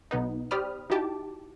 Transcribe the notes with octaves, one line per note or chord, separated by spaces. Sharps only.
B1 B2 B3 D#4
G4 C5 D5 B5 D#6 F6
D#4 E4 F#4 G4 A5 D6